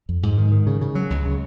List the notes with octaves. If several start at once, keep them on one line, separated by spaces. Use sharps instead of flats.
F2
G#2
D#3
D#3
C#3
C#3
F#3
C#2
C#3